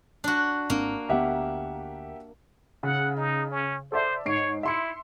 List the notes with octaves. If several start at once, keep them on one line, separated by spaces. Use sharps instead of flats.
D4 F#4
G#1 A#3 C4 D4
D2 B3 G4 E5 F#5
C#3 F#5
D#4
C#4
A4 C5 D5 E5
G#2 C#5 C7 D7
E4 E5 C6 C#7